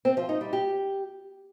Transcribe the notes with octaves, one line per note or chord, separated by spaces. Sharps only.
C4
F3
D#4
G3
G4